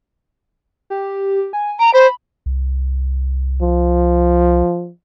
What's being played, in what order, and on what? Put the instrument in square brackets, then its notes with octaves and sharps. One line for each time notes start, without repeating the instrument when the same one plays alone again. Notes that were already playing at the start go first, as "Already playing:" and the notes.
[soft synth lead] G4
G#5
[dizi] A#5 [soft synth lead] D7
[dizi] C5 [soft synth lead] B5
[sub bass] C2
[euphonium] F3